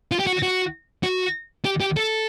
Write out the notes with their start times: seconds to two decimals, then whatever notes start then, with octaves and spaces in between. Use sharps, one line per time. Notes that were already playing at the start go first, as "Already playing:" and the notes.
0.12 F4
0.19 G4
0.27 F#4
0.43 F#4
1.03 F#4
1.65 G4
1.80 G4
1.97 A4